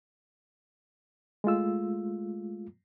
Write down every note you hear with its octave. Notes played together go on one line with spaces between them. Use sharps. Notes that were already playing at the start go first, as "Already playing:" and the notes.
G#3 A3 F4 E6